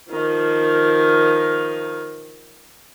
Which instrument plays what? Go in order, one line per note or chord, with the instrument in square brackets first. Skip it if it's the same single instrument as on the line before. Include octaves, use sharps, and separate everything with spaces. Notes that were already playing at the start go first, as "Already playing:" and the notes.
[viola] D#3 F3